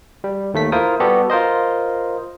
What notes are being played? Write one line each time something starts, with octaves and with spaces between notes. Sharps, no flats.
G3
D#2 A3 B6
E4 F4 A#4 C5 D#6
G3 B3 F#4 G4 A4
F4 A#4 C5 D#5